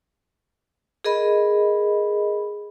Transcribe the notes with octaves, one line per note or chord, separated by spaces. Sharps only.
G#4 A#4 D#5 B5